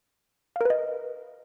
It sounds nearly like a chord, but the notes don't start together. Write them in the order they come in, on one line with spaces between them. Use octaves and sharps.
F5 A#4 B4 D#5